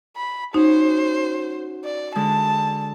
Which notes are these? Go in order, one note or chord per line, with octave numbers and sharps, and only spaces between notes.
B5
C#4 D#4 F#4 C5
D5
D3 G#3 A5